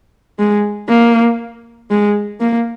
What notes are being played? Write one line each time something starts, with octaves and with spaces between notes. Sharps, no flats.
G#3
A#3
G#3
A#3